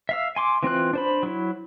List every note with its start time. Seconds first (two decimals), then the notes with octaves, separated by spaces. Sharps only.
0.09 E5 F5 E6
0.36 G#5 C6 D6
0.63 E3 C4 F4 F#6
0.93 D4 C5 B5
1.23 F#3 E4